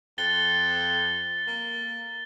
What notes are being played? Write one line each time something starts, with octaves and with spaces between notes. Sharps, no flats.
F2 A6 G7
A#3